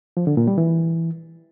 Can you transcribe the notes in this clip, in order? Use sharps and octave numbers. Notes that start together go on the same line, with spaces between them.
F3
D3
A#2
G3
E3